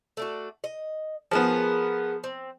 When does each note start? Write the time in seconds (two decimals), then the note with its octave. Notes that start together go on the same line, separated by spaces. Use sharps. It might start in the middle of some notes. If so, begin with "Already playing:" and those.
0.17 A3 D4 F#4
0.64 D#5
1.31 F3 B3 G#4 A#4
2.24 C4